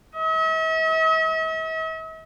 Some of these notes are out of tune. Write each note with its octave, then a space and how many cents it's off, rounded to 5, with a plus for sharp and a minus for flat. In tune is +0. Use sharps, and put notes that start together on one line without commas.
E5 -45